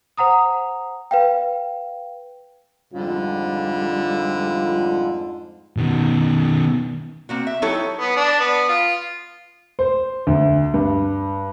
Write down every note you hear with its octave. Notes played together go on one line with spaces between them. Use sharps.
C5 F#5 A#5 D#6
B4 F5 G5
F2 G#2 D3 G3 F4
B2 D#3
A#3 C4 F#4
E5
F#3 D#4 E4 G4 A4 C#5
B3
D4
B3
F4
C5
D2
G2